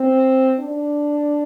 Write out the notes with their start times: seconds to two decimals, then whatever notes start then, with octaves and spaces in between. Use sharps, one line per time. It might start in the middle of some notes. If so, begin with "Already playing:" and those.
Already playing: C4
0.60 D4